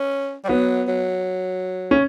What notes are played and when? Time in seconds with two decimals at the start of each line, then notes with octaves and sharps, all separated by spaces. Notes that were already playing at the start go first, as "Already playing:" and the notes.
Already playing: C#4
0.44 G3
0.48 F#3 B3
0.88 F#3
1.91 C#3 C#4